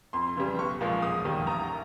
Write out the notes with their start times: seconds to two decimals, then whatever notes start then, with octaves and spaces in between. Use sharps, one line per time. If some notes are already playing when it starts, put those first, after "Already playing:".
0.13 F2 C6
0.37 C#3 E3 G3
0.59 B1 C#6
0.81 A#2 F3 G#3
1.02 E1 D#6
1.25 D#2 D#3 G3
1.47 A1 A#5